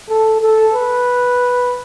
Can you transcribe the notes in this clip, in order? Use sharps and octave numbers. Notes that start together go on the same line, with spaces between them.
A4
A4
B4